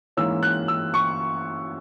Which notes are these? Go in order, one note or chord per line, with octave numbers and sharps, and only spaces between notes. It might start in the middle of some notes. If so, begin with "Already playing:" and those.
G#2 E3 A#3 C#4 E6
F#6
E6
C#6